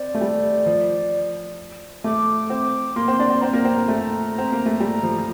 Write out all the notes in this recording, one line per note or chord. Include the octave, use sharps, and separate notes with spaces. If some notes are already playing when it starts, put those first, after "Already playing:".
Already playing: C4 D5
A3
G3
F3
A3 D6
C4
A#3 C6
C4
D4
C4
C4 A#5
A#3
C4
A#3
A3
C4 A#5
A#3
A3
G3
F3
F3